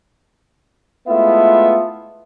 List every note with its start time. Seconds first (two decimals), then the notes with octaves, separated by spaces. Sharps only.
1.08 G#3 A3 B3 E4 F4 E5